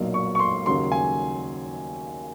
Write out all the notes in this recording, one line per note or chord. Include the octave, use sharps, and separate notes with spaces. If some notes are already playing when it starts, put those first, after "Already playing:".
Already playing: B1 A#2 F#3
C#6
C#6
C6
D#2 C#3 F#3 C6
G#5